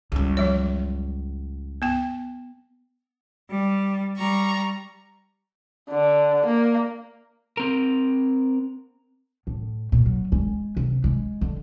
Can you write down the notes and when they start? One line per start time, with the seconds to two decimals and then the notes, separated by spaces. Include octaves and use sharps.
0.12 C#2 G2
0.37 F3 F#3 C#5
1.82 B3 G5
3.50 G3
4.17 G3 A#5 C#6
5.90 D3
6.46 A#3
7.57 C4 A#4
9.47 A2
9.92 A#2
10.06 F#3
10.32 G#3
10.77 C3
11.04 G#3
11.41 D3